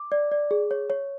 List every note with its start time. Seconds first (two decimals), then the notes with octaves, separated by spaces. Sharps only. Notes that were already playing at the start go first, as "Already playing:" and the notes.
Already playing: D6
0.12 D5
0.32 D5
0.51 G#4
0.71 C#5
0.90 C#5